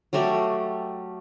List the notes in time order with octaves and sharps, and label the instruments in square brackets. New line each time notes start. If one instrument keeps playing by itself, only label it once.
[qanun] F#3 G3 A3 G4